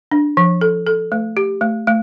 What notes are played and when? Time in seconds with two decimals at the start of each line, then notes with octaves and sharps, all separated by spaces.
0.11 D4
0.37 F3
0.61 A4
0.87 A4
1.12 A3
1.37 G4
1.61 A3
1.87 A3